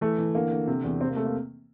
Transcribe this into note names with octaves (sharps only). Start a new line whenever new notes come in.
E3 A3
E3
D3 A#3
D3
C3
E2
C3 C4
A#3
A3
A#3